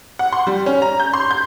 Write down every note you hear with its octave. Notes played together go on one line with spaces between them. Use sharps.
F#5
C6
G3
C#4
A#5
G6
C6
G6